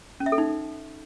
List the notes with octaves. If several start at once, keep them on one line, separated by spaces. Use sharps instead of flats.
C#4
E5
A4
D#4